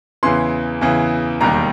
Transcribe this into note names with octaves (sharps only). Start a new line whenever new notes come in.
E2 C#3 E3 C6
E2 C#3 E3
E1 D#2 D#3 G3 A#5